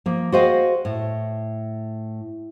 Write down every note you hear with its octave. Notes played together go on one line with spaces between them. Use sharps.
F3 A#3
F#4 G#4 C5 D#5 F5 G5
A2